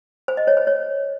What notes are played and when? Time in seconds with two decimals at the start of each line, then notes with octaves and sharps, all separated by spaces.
0.28 C5
0.37 D#5
0.47 C#5
0.57 C5
0.67 C#5